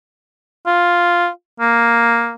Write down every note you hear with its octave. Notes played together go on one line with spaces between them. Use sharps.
F4
A#3